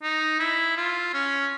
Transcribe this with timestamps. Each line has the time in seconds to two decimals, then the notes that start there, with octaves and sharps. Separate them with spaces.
0.03 D#4
0.39 E4
0.77 F4
1.13 C#4